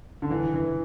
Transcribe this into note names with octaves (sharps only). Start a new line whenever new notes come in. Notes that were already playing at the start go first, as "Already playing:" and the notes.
D3
E3
E3